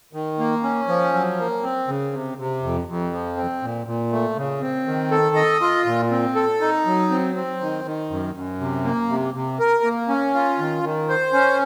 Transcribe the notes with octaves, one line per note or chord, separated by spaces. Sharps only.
D#3
A#3
C#4
F3
F#3
A#3
C4
C#3
C3
C3
F2
F2
F3
C4
A#2
A#2
A3
C#3
C4
D#3
A4
D#5
F4
A#2
C4
A4
D#4
F#3
C4
C4
D#3
D#3
F#2
F#2
C3
A#3
C3
C3
A#4
A#3
C#4
F4
D#3
D#3
C5
C#4